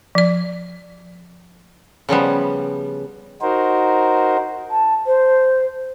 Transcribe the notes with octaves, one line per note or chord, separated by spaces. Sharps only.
F3 D5
C#3 F3 G3 B3
D#4 F#4 A#4 C5
A5
C5